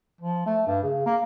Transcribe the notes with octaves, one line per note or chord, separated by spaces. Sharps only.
F3
A3
G2
C#3
A#3